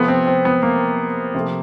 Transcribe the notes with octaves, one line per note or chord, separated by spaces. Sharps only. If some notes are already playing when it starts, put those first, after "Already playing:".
Already playing: C3 F3 A3 B3
C4
C4
B3
A#3
C3 F3 A3